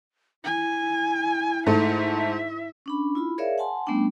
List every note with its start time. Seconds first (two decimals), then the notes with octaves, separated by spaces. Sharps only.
0.44 E4 G#5
1.66 G#2 A3 E5
2.86 C#4 D4 B5
3.15 E4 F4 B5
3.38 G#4 A#4 C#5 D5 E5 F5
3.58 F#5 G#5 A5 C6
3.87 G3 A3 B3 C#4 D4 G5